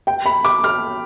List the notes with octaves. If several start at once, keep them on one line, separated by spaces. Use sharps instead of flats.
G5
B5
D6
F6